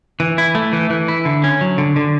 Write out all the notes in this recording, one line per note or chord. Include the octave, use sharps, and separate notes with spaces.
E3
E4
A3
E3
E3
E4
D3
C#4
F#3
D3
D3